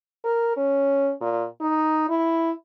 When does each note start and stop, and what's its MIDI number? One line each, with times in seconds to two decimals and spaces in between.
0.24 0.53 70
0.57 1.12 61
1.21 1.45 46
1.61 2.08 63
2.09 2.51 64